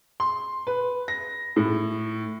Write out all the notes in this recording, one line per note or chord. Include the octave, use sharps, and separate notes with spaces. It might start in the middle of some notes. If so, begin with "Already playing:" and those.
C6
B4
A#6
A2